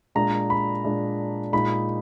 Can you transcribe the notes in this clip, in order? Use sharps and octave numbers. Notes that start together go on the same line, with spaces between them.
A#2 G#3 D4 A#5
B5
A#2 G#3 D4
A#2 G#3 D#4 B5